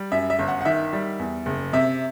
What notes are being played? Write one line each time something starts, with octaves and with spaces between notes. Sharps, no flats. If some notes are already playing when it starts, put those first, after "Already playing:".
Already playing: G3
F#2 E5
E5
G1
F#5
F#5
D#3 E5
G3
E2
F#1
C3 E5